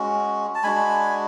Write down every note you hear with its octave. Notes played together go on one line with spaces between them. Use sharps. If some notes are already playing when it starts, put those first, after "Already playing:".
Already playing: G#3 C#4 F#4
A5
G#3 D4 F#4 G#5 B5